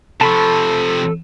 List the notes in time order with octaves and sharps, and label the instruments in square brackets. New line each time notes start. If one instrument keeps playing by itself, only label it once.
[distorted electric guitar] C3 F3 [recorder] A4 [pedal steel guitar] A5 B5 C#6